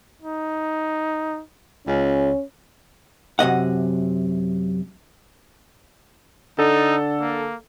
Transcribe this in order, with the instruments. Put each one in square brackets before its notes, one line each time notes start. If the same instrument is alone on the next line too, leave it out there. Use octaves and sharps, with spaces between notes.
[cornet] D#4
[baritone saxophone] C#2 [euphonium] C#4
[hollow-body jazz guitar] F#2 C3 D#5 F#5
[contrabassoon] D3 [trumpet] D#4 [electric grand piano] A4
[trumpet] A#3